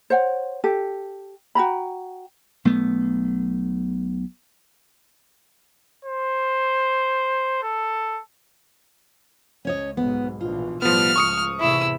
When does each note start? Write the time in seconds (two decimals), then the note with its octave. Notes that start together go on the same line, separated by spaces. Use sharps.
0.10 C5 C#5 F#5 G5
0.64 G4 A4
1.55 F#4 G5 A#5 B5
2.65 B1 A3 B3
6.05 C5
7.62 A4
9.65 C#2 C#4 C#5 D#5
9.97 B1 G#2 B3
10.41 A#1 B2 E3 F4
10.82 B1 A2 F3 G3 B3 F6
11.16 C#2 A2 F3 C#6 D#6 C#7
11.60 E2 A2 C3 E4 E6